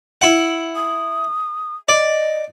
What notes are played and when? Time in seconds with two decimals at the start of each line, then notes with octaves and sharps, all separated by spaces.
0.21 E4 F#5
0.76 D#6
1.89 D5 D#5